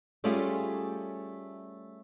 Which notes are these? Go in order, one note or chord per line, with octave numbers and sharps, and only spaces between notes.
G3 A3 C#4 F4 G4 G#4